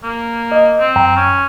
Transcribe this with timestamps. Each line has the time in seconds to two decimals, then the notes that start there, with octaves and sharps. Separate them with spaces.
0.03 A#3
0.52 D#5
0.79 C4
0.96 F#2 G5 A#5
1.17 C#4